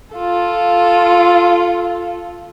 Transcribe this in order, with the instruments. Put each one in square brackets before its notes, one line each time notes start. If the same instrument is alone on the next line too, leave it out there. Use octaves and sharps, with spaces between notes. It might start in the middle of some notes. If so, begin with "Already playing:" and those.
[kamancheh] F4 A4